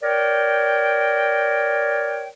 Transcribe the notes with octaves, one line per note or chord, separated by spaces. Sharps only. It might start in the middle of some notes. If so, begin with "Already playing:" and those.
A#4 C#5 D5 G5